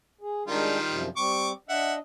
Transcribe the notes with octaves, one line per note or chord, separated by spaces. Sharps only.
G#4
D#3 G3 G#3 D4 F4 A#4
F#2 C3 F3
G3 C4 C#6 D6
D4 D#5 E5 F#5